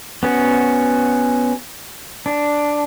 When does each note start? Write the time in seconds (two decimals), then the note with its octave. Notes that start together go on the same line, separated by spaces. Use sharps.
0.23 B3 C#4 F#4
2.26 D4